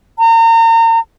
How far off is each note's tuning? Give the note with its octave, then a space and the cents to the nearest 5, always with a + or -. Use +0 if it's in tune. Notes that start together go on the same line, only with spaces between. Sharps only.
A#5 -35